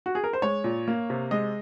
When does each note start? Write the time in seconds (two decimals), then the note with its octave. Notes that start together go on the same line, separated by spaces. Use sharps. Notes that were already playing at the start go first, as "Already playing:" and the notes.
0.06 F#4
0.15 G#4
0.24 A#4
0.33 C5
0.42 G#3 C#5
0.64 A#2
0.88 A#3
1.10 C3
1.31 G#3 D#5